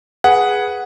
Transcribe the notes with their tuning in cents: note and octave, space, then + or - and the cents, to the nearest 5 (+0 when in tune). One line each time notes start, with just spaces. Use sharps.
G#4 +0 B4 -10 F#5 +0